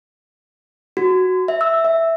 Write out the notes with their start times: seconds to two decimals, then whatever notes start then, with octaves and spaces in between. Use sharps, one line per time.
0.97 F#4
1.48 E5
1.61 E6
1.85 E5